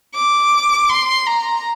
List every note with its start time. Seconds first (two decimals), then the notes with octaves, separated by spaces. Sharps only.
0.15 D6
0.89 C6
1.26 A#5